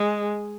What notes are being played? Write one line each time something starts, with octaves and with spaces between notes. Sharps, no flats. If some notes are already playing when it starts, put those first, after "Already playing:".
Already playing: G#3